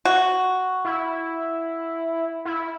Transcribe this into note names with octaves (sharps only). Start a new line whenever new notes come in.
F#4
E4
E4